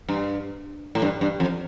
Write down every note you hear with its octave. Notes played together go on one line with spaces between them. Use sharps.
G2
A2
G2
G2
F2